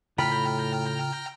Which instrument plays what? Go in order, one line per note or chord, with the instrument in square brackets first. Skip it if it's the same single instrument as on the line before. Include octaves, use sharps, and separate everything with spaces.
[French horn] A2 [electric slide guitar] C#3 F4 A4 [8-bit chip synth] G5 A#5 F6 [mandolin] B5